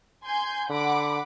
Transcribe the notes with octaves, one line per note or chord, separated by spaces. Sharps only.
G#5 C6 G6
D3 F#5 B5 D6